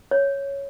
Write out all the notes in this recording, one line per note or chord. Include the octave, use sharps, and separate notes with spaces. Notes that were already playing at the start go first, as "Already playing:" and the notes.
C#5